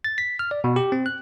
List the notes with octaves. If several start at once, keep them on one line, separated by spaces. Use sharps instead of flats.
A6
B6
F6
D5
B2
G4
C4
F#6